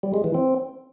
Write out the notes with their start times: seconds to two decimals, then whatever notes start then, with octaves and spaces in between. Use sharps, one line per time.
0.03 G3
0.14 G#3
0.24 E3
0.34 C4